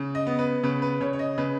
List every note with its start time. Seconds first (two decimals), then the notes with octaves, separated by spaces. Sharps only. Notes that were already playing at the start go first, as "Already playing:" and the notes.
Already playing: C#3
0.15 D#5
0.27 B3
0.39 B4
0.63 C#3 B4
0.82 B4
1.01 C#3 C#5
1.13 C#5
1.19 D#5
1.38 C#3 B4